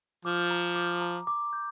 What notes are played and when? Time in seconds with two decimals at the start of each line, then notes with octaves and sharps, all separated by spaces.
0.25 F3 D6
0.50 A#5
0.75 D6
1.01 A#5
1.27 D6
1.53 G6